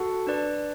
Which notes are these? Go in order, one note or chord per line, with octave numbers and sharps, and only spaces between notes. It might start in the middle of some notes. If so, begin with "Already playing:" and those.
Already playing: F#4 A4 F#5 A5
D4 B4 D5